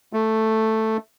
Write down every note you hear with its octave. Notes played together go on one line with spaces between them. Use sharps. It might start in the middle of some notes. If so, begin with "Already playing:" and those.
A3